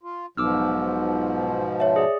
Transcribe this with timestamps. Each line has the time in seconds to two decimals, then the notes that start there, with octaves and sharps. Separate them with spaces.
0.03 F4
0.37 B1 G#2 B2 F3 D6 E6 F6
1.80 C#5 E5
1.96 G#4 D5